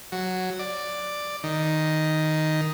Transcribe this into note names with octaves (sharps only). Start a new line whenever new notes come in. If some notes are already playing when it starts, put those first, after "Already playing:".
F#3
D5
D#3